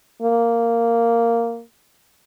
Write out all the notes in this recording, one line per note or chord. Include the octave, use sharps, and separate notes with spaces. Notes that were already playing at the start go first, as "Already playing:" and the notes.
A#3